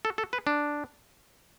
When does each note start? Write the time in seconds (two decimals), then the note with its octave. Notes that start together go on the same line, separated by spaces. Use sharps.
0.05 A4
0.18 A4
0.33 B4
0.47 D4